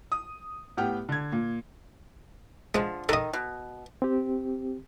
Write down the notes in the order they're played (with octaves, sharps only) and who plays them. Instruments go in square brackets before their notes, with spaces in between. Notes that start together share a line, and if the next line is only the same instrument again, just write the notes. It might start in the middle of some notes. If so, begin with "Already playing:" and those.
[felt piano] D#6
A2 B3 G4 F#5 G5 F6
D3 G#6
A#2
[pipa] D3 F3 [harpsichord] G#3
[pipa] D#3 [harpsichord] A4 D#5
[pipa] B2
[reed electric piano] C4 G4